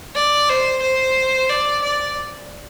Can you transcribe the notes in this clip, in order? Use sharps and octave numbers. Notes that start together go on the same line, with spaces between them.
D5
C5
C5
D5
D5